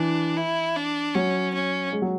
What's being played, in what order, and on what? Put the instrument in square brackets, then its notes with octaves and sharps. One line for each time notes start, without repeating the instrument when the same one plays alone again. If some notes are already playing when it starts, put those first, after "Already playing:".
Already playing: [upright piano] E3 [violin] D4
[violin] E4
D4
[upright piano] F#3 [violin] C#4
[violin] C#4
[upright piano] G#3
F#3